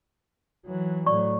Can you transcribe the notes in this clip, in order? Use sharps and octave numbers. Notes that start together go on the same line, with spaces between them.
E3 F#3
A2 F#3 D5 C#6